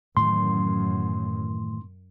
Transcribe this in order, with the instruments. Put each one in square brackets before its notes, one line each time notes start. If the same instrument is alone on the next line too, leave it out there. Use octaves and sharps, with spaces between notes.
[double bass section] F#2 [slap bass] A2 D#3 E3 [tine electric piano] C6